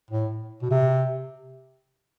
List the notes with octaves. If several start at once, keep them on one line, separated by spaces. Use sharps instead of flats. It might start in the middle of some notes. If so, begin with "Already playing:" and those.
A2
B2
C3